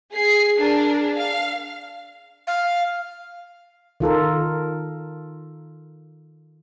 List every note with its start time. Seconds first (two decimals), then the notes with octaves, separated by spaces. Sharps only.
0.11 G#4 C7
0.57 D4 G#4 A#4
1.14 F5
2.47 F5
4.00 D#3 F4 A4 A#4